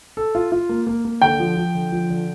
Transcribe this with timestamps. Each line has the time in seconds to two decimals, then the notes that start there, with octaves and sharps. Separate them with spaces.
0.17 A4
0.35 F4
0.52 F4
0.69 A#3
0.87 A#3
1.05 A#3
1.22 D3 G5
1.40 F3
1.57 F3
1.75 D3
1.92 F3
2.10 D3